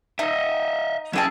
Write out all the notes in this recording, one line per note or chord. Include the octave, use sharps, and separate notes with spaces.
D#4 D#5 E5
F#3 C#4 E4 G#4 G5 A5